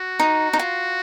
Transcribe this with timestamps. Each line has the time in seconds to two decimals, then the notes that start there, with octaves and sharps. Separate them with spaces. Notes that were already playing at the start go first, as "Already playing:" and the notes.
Already playing: F#4
0.20 D#4
0.53 D#4
0.59 F4